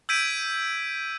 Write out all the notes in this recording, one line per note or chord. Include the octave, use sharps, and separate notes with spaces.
E6 G6 G#6 B6 D7 D#7